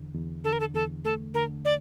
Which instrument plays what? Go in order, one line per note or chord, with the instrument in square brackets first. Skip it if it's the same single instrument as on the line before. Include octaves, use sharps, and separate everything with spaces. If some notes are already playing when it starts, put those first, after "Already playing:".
Already playing: [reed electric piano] E2 D3
E2
[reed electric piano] D3 [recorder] A4
[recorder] A#4
A4
[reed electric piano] E2 [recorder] A4
[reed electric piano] A3 [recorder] A4
[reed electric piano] D3 [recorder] A#4
[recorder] D5